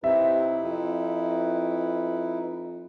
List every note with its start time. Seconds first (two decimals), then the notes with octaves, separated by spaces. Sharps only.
0.04 C3 D#4 E4 B4 E5
0.63 F2